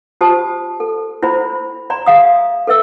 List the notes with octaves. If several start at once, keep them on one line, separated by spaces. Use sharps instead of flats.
F4 G4 C5 A5 D#6
A4
E4 C5 B5
D5 A#5 C6
G#4 E5 F5 D#6
A4 B4 E5 E6